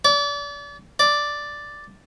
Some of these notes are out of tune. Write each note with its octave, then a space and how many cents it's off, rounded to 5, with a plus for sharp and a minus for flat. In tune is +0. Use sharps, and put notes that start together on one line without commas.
D5 -35
D5 +0